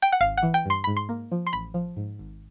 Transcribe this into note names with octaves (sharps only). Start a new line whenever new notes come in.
G5
F#5
G#1 F5
F#5
E3
G5
G2 C6
G#2 B5
C6
A#3
F3
C6
A1 B5
F3
G#2
G#1